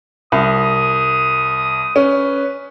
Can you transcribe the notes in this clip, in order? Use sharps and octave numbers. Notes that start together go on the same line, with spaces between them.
C2 D#6
C#4 B4